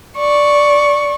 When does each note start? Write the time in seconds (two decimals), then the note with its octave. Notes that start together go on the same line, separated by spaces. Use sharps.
0.18 D5 C#6